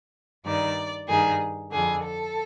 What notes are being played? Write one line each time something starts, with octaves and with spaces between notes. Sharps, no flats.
G2 D#3 D5
G2 D#3 G#4
F2 D3 G#4
A4